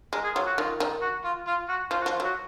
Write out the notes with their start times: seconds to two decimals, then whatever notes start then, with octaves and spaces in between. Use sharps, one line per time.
0.13 G#3 A#4
0.24 G#4
0.35 F#3 F4
0.47 F#4
0.57 D#3 F4
0.80 D#3
1.02 F#4
1.24 F4
1.47 F4
1.69 F#4
1.91 F3 F4
2.01 F#4
2.06 F3
2.12 F4
2.20 F#3 F#4